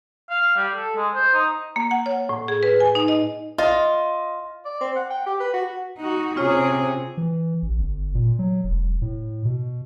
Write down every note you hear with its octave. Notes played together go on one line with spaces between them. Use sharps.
F5
G3
A4
G#3
C5
D#4
A#3
F#5
C#5
A2
G#4
B4
G#5
D#4
D#5
F4 D#5
D5
C4
F#5
G5
G4
B4
F#4
D#4 F#4
C3 C#4 F4 G#4 C#5
E3
A1
G1
A#2
F#3
E1
A2
B2